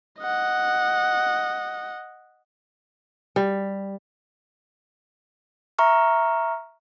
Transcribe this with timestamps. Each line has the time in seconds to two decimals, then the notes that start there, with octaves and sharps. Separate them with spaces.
0.20 D#5 F#5
3.36 G3
5.79 E5 A#5 C#6 F6